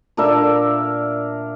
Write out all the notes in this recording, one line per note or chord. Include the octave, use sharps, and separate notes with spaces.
A#2 D4 A#4 E5